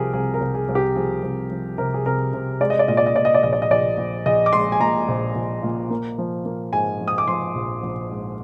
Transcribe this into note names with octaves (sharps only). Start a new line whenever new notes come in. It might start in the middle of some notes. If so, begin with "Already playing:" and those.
Already playing: C2 C3 F3 G4 G#4 A#4
C2 G#4
A#4
C2
G#4
C2
G4
F3 G#4
C2
F3
C3 A#4
G#4
C3 A#4
C3
G#3 D5
D#5
D5
A#2 D#5
D5
D#5
A#2 D5
D#5
D5
A#1 D#5
D5
D#5
A#1 D5
A#1
A#1 D#5
D6
G#3 C6
G#5
A#2 A#5
A#1
A#1
A#2
A#3
F3
A#3
G#2 G#5
F3
D#6
D6
F3 C6
A#1
A#1
G#2